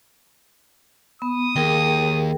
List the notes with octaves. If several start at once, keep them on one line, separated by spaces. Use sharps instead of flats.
B3 D#6
D#2 G#4 A#4 G5